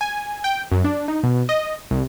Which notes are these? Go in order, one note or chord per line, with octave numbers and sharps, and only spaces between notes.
G#5
G5
F#2
D4
D#4
B2
D#5
C2